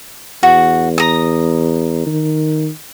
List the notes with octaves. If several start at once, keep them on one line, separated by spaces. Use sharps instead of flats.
E2 F#4
A#5 D#6
D#3